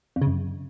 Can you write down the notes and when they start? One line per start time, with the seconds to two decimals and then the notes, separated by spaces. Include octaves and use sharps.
0.16 F2
0.22 C#3
0.27 F#2